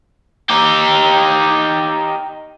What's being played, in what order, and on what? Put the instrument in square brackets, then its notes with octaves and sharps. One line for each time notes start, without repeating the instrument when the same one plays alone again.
[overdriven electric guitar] D#4 G4